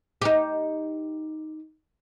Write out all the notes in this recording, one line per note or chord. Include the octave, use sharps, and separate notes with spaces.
D#4 G4